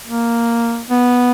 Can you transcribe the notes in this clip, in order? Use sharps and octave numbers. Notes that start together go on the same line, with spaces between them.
A#3
B3